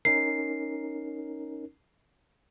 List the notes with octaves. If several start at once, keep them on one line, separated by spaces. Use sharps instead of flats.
C#4 D#4 A#4 C7